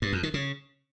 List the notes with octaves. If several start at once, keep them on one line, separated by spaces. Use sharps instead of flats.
G2
F2
D#3
C#3